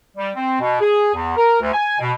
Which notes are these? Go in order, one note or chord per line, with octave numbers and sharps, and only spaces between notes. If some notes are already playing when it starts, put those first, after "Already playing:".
G3
C4
B2
G#4
E2
A#4
D2
G#5
B2